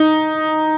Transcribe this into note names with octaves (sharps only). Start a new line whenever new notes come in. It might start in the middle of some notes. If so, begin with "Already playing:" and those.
Already playing: D#4